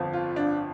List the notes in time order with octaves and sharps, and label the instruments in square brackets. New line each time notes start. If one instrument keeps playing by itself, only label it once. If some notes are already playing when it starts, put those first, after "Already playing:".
Already playing: [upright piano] G1 F2 F3
F4
D4